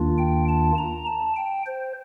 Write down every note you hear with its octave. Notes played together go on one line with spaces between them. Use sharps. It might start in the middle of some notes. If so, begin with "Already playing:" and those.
Already playing: D#2 D#3 A#3 D4 F4
G5
A5
A#5
A5
G5
C5